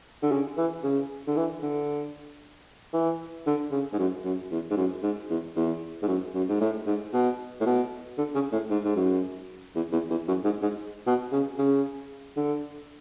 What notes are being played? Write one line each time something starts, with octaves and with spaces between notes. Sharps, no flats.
D3
C#3
E3
C#3
D3
E3
D3
E3
D3
C#3
G#2
F#2
F#2
E2
G#2
F#2
G#2
E2
E2
G#2
F#2
F#2
G#2
A2
G#2
B2
A2
B2
D3
C#3
A2
G#2
G#2
F#2
E2
E2
E2
F#2
G#2
G#2
B2
C#3
C#3
D3